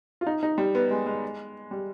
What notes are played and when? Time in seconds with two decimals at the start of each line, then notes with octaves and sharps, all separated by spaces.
0.21 F4
0.27 D#4
0.43 D#4
0.58 G3
0.75 B3
0.91 G#3
1.06 G#3
1.71 G3